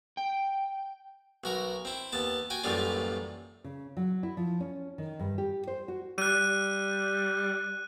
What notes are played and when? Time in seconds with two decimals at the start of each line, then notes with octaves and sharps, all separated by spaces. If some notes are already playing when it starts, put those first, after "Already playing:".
0.17 G5
1.44 B1 F#4 A#4
1.85 C4 E4
2.12 D#2 B3 A5
2.50 F#4 G5 G#5
2.64 A1 F#2 A2 G3 A#3 F4
3.64 C#3
3.97 F#3
4.23 E4
4.37 F3
4.60 C#4
4.98 D#3
5.19 G2
5.38 G4
5.67 C5
5.88 F#4
6.18 G3 F#6 D#7